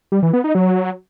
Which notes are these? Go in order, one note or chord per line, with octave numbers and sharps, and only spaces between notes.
G3
E3
B3
D#4
F#3